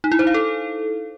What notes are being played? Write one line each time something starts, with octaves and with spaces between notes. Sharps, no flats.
D#4
E4
C5
F5
A4